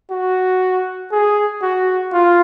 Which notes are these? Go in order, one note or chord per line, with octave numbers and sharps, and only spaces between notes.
F#4
G#4
F#4
F4